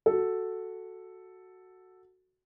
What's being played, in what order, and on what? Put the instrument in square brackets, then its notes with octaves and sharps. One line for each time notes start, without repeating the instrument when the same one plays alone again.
[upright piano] F#4 A4